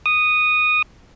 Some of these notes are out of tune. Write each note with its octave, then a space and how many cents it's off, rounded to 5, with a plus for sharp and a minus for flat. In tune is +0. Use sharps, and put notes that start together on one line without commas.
D#6 -10